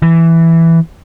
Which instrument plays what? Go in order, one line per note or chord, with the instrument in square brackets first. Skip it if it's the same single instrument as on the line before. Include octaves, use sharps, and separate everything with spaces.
[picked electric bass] E3